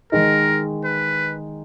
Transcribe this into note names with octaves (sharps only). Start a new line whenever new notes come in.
D#3 G#3 D#4 A#4
B4